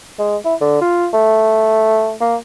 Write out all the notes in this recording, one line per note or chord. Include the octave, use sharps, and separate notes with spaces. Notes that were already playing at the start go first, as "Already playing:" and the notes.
G#3
E4
D3
F4
A3
A#3